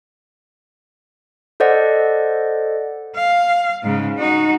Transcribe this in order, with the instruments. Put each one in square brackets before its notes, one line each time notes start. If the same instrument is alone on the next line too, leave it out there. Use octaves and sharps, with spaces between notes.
[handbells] A4 C5 D5 D#5 F#5
[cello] F5
G#2 C#3
D#4 F#4